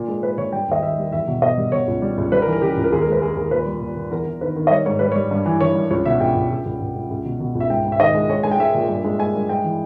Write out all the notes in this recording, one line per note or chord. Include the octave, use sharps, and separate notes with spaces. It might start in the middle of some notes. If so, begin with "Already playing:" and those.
Already playing: A#2
G#3
G#3 B4
A#2 C#5
G3 G5
D#2 D#5
D#2 E5
G3
E2 E5
B2
B2 D#5
G3
B2 C#5
C#2
G3
C#2
G3 B4
A#4
E3
A#4
C#3 G4
C#2
A#4
D#2 G#4
A#4
G#3 B4
G#3 G#4
D#2 G#4
A#2 B4
G3
A#2
A#2
E2 A#4
E2
D#3 B4
D#3
D#5
G3 C#5
G#2 C#5
G3 B4
G3 C#5
G2
E3
E3 C#5
G2
C#2 C#5
B2 E5
C#2 G5
C#2
C#2
C#2
C#2
C#2
C#2
B2
B2
C#2
E5
G#2 G5
G#2
E5
D#3 D#5
G#3
G#3 C#5
G#3 G#5
G5
G#3 E5
A#2
G2
G#3
G#3 G#5
G2
G#3 G5
E3